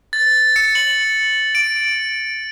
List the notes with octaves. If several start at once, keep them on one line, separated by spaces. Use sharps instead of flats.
A6
C#7
F#7
D7